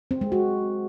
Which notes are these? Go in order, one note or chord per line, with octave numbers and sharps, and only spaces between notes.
C4
G#3
F#4